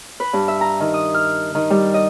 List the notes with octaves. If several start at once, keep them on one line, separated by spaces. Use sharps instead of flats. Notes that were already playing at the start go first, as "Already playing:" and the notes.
B4
G2
E5
A#5
D#3
D#6
F6
D#3
G3
D#5